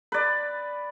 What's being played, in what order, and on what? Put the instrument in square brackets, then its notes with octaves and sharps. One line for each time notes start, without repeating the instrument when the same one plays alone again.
[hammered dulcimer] B4 D5